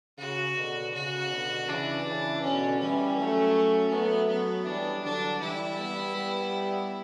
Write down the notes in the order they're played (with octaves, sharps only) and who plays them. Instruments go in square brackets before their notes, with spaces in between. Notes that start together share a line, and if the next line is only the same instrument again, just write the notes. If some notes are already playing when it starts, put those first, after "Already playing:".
[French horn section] C#3 [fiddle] F#4
[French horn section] B2 D3
[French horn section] C#3 [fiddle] F#4
[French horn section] B2 D3
[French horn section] C#3 E3 [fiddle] D4
[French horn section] C#3 E3
[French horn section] B2 D3 [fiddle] C#4
[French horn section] E3 G3 [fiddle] C#4
[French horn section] F#3 A3
[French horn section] F#3 A3 [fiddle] B3
[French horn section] F#3 A3 [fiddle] B3
[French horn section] E3 G3 [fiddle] D4
[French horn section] D3 F#3 [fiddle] D4
[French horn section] E3 G3 [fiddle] E4
[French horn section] G3 B3
G3 B3